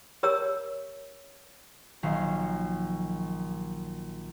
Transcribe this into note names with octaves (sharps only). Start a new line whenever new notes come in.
G4 A#4 C#5 A#5 E6
A#1 D#3 F#3 F5 C7